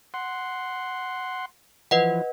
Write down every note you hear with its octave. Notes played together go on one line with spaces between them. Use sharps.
F#5 C6
E3 F3 B4 D#5 F#5